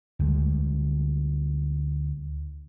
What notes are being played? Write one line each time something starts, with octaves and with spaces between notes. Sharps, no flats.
D2 G3 G#3